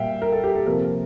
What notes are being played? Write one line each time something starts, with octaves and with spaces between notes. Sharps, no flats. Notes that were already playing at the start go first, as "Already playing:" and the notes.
Already playing: A#2 G3 A#3 E5 F5 G5
A#4
A4
G4
A4
C3 F3 A#3 A#4